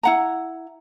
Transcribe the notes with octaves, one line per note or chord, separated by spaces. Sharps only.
E4 F#5 A#5